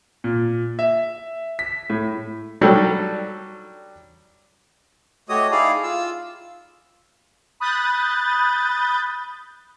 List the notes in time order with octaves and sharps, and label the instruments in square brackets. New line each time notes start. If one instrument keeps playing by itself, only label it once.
[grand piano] A#2
E5
B6
A2
[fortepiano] F#3 G3 D4 G4 A4
[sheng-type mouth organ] A3 F#4 G4 C#5 D#5 D#6
D#4 E4 G4 G#4 D5 F5
F4 E6
[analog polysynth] B5 D#6 F#6 G6 A6